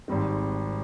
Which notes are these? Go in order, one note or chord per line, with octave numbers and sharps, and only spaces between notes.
G#1 G#2 G3 C4